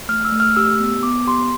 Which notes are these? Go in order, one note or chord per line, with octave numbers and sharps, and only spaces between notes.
A3 F6
E6
A3
F6
G4 E6
B3
B3 D6
G4 C6